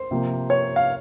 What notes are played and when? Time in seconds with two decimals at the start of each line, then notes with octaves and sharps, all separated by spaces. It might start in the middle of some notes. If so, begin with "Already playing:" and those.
Already playing: C5
0.11 C3 F3 A#3
0.50 C#5
0.76 F5